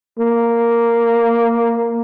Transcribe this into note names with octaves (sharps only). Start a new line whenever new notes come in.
A#3